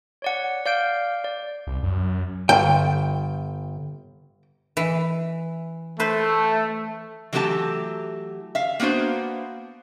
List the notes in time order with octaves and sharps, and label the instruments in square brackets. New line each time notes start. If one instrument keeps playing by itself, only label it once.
[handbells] C#5 D5 F#5
D5 F5 G6 D7
D5
[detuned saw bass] C2
F#2
[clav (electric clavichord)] G1 [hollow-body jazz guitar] G5
[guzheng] E3
[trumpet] A3 [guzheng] B4 C5
[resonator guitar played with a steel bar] E3 F#3 A3 A#3 G4 A5
E5 F5
A#3 B3 D4 F#4 C5